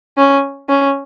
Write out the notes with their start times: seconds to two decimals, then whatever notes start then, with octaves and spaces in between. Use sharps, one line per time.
0.18 C#4
0.69 C#4